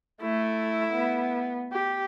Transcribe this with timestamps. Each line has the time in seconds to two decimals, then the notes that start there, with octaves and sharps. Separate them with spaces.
0.22 A3 E4
0.94 B3
1.72 G4